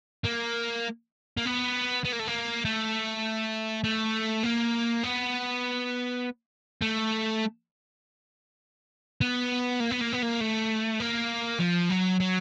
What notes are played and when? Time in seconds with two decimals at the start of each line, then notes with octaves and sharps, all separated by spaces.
0.25 A#3
1.37 A#3
1.45 B3
2.05 B3
2.13 A#3
2.20 A3
2.28 A#3
2.65 A3
3.84 A3
4.43 A#3
5.03 B3
6.82 A3
9.21 B3
9.80 A#3
9.91 B3
10.01 A#3
10.13 B3
10.22 A#3
10.41 A3
11.00 A#3
11.59 F3
11.90 F#3
12.20 F#3